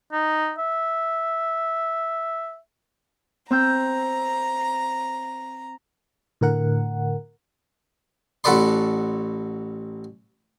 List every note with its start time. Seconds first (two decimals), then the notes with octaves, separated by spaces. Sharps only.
0.12 D#4
0.58 E5
3.51 C4 A#5 E6 G6
6.41 A2 D3 A#4 F#5
8.44 A1 F#4 A4 B4 D5 C6